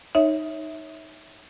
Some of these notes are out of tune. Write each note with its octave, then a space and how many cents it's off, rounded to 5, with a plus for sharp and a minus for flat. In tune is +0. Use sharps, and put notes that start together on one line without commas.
D#4 +0 C#5 +0 E5 -15